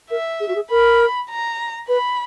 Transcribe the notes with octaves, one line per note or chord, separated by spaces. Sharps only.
A#4 E5
G#4
F#4
G#4
A#4 B5
A#5
B4 B5